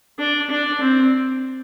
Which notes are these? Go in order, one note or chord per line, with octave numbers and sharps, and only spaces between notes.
D4
D4
C4